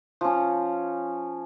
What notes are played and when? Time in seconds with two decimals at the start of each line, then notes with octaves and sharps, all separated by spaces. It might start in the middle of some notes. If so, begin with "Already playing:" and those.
0.21 F3 C#4